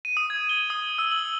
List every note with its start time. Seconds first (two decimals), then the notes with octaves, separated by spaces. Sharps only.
0.05 D#7
0.17 D#6
0.30 G#6
0.49 G7
0.70 D#6
0.98 E6
1.11 F#7